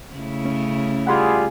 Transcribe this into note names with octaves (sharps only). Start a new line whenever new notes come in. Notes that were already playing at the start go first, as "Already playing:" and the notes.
C#3 A3 E4
C#4
G3 F4 G#4 F#5 B5 C6